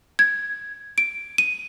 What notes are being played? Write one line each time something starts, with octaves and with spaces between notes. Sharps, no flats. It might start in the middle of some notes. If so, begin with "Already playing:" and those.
G#6
D7
D#7